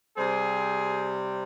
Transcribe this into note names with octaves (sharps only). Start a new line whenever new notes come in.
C3 G3 C4 G#4